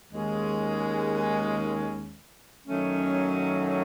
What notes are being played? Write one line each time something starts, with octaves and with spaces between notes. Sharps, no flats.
D#2 D#3 G#3 C#4
F#2 D#3 F#3 A3 C#4